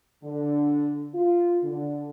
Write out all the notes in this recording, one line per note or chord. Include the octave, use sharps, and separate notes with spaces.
D3
F4
D3